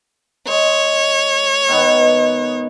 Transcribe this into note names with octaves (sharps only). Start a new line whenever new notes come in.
G#3 C#5
B2 D#3 B3